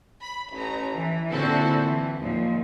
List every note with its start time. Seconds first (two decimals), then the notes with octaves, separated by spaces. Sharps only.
0.22 B5
0.53 A1 A#5
0.95 E3
1.31 A#2 D3 C4 E4 F#4 A4
1.83 E3
2.18 D#2 A#2 D#3 F3